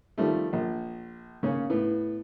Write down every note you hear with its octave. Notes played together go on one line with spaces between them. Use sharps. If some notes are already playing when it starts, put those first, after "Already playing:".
D#3 F3 G3 A3
A#1
C#3 A#3 C#4
A2 B3